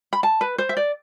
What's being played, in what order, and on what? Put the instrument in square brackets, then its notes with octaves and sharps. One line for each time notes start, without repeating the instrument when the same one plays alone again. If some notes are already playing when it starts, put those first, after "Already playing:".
[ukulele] B5
A5
B4
C5
E5
D5